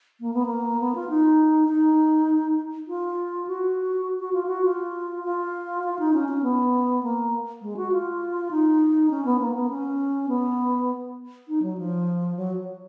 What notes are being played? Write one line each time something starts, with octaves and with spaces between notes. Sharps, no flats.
A#3
B3
A#3
B3
F4
D#4
D#4
F4
F#4
F#4
F4
F#4
F4
F4
F4
D#4
C#4
C#4
B3
A#3
G#3
F#4
F4
D#4
C#4
B3
A#3
B3
C#4
B3
D#4
F#3
F3
F#3